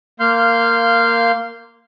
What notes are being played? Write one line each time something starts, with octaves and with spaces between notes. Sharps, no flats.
A#3 F5 C6 F6 G6